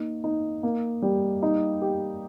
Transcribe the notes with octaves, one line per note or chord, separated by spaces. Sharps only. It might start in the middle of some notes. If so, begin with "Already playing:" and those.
Already playing: A#3 D#4
D#4
A#3
G3
D#4
G4